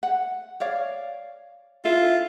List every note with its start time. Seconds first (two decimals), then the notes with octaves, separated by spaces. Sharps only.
0.03 F#5
0.60 C#5 D5 F5
1.85 E4 F4 A4 E5